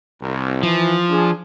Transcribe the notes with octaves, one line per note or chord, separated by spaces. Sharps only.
C2
E3 F3
D4 G#4